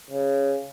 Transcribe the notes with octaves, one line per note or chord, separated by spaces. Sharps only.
C#3